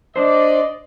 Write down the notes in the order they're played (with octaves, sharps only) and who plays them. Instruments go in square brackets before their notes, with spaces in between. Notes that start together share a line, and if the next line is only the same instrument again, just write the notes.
[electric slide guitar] D4 C5 [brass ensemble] D5 D#5